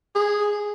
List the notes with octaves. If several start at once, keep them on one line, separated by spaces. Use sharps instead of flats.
G#4